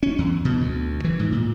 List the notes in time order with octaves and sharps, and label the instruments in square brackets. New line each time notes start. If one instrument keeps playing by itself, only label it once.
[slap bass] C#4
E2
B2
D2
E3
G#2
A#2